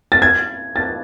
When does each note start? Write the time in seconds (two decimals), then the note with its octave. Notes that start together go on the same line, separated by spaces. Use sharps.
0.12 A6
0.22 G#6
0.76 A6